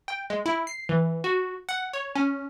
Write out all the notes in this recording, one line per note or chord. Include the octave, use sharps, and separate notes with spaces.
G5
G#3
E4
C7
E3
F#4
F#5
C#5
C#4